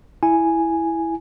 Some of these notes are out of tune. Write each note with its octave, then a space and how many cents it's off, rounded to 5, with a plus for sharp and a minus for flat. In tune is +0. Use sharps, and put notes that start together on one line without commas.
E4 +0 G#5 +0